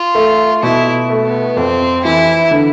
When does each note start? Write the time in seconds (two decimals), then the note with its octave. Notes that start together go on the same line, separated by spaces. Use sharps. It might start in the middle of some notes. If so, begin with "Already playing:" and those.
Already playing: F4
0.15 A3
0.63 B2 E4
1.10 A3
1.26 B3
1.57 F2 C4
2.04 E3 E4
2.51 D3